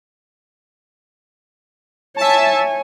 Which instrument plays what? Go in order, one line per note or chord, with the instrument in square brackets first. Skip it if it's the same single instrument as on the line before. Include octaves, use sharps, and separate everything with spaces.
[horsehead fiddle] C#5 G#5 [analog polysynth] E5 A5